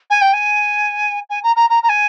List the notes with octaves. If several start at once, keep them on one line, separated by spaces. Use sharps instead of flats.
G#5
G5
G#5
G#5
A#5
A#5
A#5
A#5
G#5